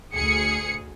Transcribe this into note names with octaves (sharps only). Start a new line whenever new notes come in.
D2 G#4 C#7